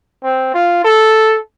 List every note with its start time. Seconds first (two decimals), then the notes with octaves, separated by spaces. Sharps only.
0.24 C4
0.54 F4
0.84 A4